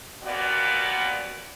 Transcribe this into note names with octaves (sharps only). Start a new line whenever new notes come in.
D#2 A#2 B3 F#4 D5